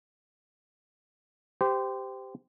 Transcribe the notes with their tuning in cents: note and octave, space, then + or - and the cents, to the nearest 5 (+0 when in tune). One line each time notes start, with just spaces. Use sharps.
G4 +0 C5 -25